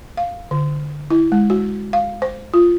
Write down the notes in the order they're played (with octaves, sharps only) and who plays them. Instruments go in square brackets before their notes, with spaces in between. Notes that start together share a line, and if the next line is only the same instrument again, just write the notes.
[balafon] F5
D3
E4
G#3
F#4
F5
C5
F4